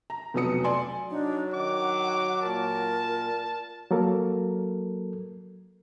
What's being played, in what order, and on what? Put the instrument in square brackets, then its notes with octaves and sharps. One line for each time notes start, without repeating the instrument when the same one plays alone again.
[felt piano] A#5
F1 B1 F#3 B4 D#6 C#7
D5 G#5 C6
[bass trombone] F#3 [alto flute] D4 [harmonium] D#4
[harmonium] D#3 [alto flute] F#5 [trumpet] D6
[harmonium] A#2 [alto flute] A#4 [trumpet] A5
[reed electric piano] F#3 A#3 A4 A#4